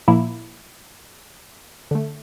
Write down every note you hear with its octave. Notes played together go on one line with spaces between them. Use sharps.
A#2 F3 A#3 E4
D3 A3